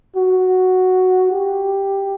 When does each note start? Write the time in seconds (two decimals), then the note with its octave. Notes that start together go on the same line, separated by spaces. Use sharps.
0.16 F#4
1.32 G4